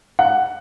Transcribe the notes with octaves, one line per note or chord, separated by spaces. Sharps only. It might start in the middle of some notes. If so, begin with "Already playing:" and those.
F#5